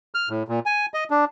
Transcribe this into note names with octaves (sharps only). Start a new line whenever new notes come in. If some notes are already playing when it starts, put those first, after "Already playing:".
F6
A2
A#2
G#5
D#5
D4